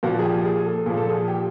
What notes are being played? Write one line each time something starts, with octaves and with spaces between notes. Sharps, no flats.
A#2 F3 F#4
G#4
G4
G#4
A4
A#2 F3 G#4
A4
G#4
G4